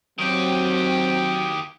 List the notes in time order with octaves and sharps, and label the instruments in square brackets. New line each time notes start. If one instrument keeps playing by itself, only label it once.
[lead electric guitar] D#3 G4 [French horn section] F#3 C4